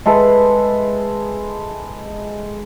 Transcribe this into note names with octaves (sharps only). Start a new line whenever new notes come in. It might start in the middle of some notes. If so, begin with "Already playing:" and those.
G#3 A4 B4 E5